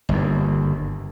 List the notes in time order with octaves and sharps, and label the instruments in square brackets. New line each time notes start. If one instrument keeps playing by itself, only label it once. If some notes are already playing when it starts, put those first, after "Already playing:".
[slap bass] G1 D#2